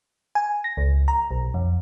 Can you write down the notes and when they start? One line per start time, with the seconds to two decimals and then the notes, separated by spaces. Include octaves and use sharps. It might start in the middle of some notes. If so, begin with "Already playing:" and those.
0.35 G#5
0.64 A#6
0.77 C#2
1.08 A#5
1.31 B1
1.54 F2